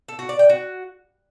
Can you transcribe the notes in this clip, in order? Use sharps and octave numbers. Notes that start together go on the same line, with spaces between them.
A4
F#4
D5
G5
F#4